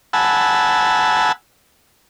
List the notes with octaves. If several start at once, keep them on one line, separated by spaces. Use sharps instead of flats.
F#5 G#5 A5 B5 E6